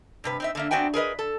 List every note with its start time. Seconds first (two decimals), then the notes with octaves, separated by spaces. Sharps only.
0.24 G2 C3 B4
0.40 C4 D#4 E5
0.55 D3 A#3 E5
0.71 B3 C4 D4 F#4 G5 G#5
0.94 G#4 A#4 B4 D#5
1.19 A4